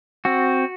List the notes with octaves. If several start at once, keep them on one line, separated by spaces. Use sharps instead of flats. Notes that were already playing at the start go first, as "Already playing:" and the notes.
C4 F#4